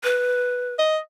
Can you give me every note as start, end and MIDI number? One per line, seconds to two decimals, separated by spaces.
0.04 0.74 71
0.79 0.98 75